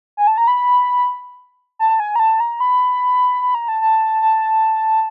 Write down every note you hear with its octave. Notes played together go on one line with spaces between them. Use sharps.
G#5
A5
A#5
B5
A5
A5
G#5
A#5
A5
A#5
B5
B5
A#5
A5
A5
A5